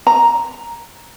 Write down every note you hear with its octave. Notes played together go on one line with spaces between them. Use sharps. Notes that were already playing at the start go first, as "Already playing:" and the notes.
A#5